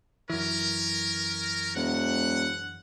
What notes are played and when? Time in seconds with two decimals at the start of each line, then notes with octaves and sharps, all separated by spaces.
0.30 F#2 E3 C#4 A#4
1.76 E1 F#5